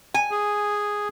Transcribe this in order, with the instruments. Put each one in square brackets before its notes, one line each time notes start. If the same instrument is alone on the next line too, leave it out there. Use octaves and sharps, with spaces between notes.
[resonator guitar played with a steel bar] G#5
[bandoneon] G#4